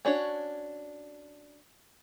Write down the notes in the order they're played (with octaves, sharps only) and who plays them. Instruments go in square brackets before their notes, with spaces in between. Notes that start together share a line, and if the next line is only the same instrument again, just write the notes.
[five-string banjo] C#4 D4 F#4 C#5